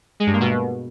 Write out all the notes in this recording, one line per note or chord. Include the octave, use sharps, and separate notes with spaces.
G#3
G2
A#3
B2